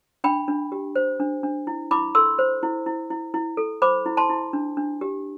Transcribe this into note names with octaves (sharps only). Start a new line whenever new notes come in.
D4 G5 B5
D4
G4
C5
D4
D4
E4
E4 B5 D6
A4 C6 E6
C5
E4
E4
E4
E4
A4
C5 B5 D6
E4
A5 C6
E4
D4
D4
G4